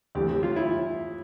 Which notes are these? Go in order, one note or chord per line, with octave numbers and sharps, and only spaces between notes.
D2 C3 E3 G4
G4
F4
E4